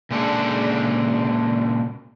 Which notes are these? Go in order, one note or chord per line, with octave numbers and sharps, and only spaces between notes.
A#2 C#3 G#3 D4 A4